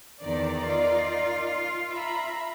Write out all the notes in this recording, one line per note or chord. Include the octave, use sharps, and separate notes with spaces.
E2 D#3 D#4 A#4 D5
F4
E5 A#5 B5